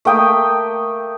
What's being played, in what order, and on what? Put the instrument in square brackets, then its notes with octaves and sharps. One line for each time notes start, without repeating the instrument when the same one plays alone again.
[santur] A3 A#3 G5 D#6